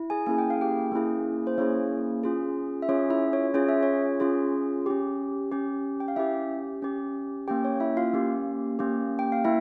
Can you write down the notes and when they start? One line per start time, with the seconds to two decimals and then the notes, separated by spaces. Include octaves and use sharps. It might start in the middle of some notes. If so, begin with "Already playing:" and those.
Already playing: E4
0.10 G#4 G#5
0.27 A#3 C#4 E4 G#4 G#5
0.38 G5
0.50 F5
0.61 G4 G5
0.92 A#3 C#4 E4 G#4
1.47 C5
1.58 A#3 C#4 E4 G#4 C#5
2.23 C#4 F4 G#4
2.82 E5
2.89 C#4 F4 G#4 C#5
3.10 E4 E5
3.33 C#5
3.54 C#4 F4 G#4 C#5
3.68 E5
3.83 C#5
4.20 C#4 F4 G#4
4.86 C#4 G4
5.52 C#4 G4
6.00 G5
6.08 F5
6.16 C#4 E4 G4 E5
6.82 C#4 G4
7.48 A#3 C#4 G4 G5
7.64 C#5
7.80 E4 E5
7.97 F4 F5
8.14 A#3 C#4 G4
8.79 A#3 C#4 G4
9.19 G5
9.32 F5
9.44 A#3 E4 E5